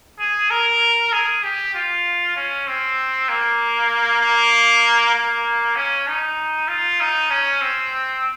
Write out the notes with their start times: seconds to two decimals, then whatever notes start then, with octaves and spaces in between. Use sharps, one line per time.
0.19 G#4
0.50 A#4
1.13 G#4
1.43 G4
1.74 F4
2.36 C#4
2.67 C4
3.29 A#3
4.22 A#3
5.14 A#3
5.76 C#4
6.07 D#4
6.68 F4
7.00 D#4
7.30 C#4
7.61 C4